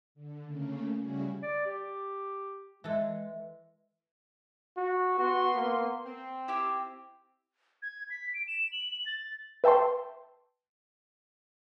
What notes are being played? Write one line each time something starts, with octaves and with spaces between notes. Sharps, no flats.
D3
C#3 A3 A#3 C#4
C#3 G3 C#4 E4 F#4 G#4
D5
G4
E3 G#3 A4
F#4
B3 F#4 C6
A#3
C4
E4 G4 E5
G#6
B6
D7
E7
F#7
F#7
A6
B4 E5 G5 A5 C6